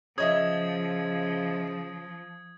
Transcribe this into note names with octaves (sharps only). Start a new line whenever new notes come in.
C#3 F3 C#5 D#5 E5 D#6 G#6